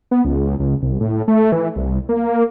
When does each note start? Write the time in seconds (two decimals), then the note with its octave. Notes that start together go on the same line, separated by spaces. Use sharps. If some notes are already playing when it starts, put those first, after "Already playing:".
0.11 B3
0.25 C#2
0.60 C#2
0.82 C2
1.00 A2
1.28 A3
1.52 E3
1.76 C2
2.09 A#3